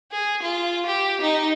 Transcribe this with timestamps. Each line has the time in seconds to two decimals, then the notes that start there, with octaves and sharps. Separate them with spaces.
0.12 G#4
0.43 F4
0.86 G4
1.21 D#4